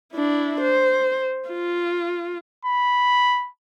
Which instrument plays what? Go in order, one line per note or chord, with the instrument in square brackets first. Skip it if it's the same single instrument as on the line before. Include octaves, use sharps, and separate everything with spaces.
[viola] D4 E4
C5
F4
[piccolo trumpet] B5